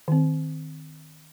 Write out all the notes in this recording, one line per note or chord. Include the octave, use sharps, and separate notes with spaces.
D#3 C4